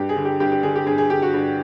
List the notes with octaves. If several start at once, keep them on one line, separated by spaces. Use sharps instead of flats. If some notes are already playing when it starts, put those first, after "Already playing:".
Already playing: G2 G4
G#4
D3
G4
G2 G4
G4
D3 G#4
G4
G2 G#4
G#4
D3 G4
F#4
G2